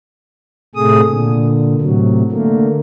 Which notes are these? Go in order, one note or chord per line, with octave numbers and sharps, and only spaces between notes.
A2 C3 A3 G#4 D#6
A#2 D3
A2 C3 F#3
D3 A3 A#3